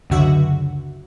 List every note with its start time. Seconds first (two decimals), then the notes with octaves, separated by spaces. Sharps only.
0.10 C#2 F#2 D3 F#4 E5